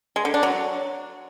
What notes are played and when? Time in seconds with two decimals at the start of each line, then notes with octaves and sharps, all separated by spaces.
0.16 G#3
0.25 D3
0.34 D4
0.43 F#3